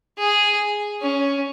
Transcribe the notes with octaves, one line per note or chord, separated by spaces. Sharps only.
G#4
C#4